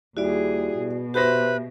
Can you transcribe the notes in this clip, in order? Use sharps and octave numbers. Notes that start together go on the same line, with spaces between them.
D#2 G3 E4 F#4 G#4 D5
B2
F#4 G4 B4 C5 E5 A#6